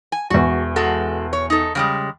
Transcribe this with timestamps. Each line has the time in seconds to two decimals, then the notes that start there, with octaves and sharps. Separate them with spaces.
0.12 G#5
0.30 E1 E2 F#4
0.76 G#3 F#4 A4
1.33 C#5
1.50 D#4 A4
1.75 C#3 G3 G#3